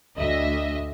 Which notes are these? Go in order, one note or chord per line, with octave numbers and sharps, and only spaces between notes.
D2 D#5 E5